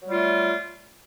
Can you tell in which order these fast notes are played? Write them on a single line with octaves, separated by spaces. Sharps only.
F#3 G3 F4 A3